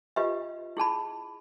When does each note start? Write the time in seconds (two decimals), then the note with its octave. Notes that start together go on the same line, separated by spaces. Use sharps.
0.16 F4 G4 B4 D#5 E5
0.77 E4 G#4 A5 B5